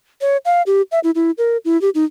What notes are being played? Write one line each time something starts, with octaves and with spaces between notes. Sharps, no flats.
C#5
F5
G4
E5
E4
E4
A#4
E4
G4
D#4